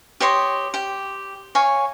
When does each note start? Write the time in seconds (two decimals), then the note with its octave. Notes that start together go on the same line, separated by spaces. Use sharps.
0.20 G4 C#5 D#5 C6
0.74 G4
1.55 C#5 F5 G#5 C#6